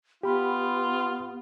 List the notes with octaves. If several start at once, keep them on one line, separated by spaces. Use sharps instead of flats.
B3 F4 G4 B5